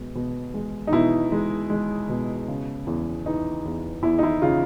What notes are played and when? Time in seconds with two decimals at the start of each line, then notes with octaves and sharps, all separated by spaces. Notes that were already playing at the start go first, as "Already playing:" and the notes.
Already playing: B2 G#3
0.15 B2
0.54 G#3
0.87 D#4
0.92 B2 E4
1.32 G#3
1.70 G#3
2.09 B2
2.48 C#3
2.87 E2
3.26 E3 D#4
3.65 E2
4.03 E2 E4
4.19 D#4
4.23 E4
4.42 C#3 F4